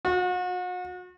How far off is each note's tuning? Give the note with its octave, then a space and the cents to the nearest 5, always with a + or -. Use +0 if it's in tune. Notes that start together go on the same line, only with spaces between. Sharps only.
F#4 -40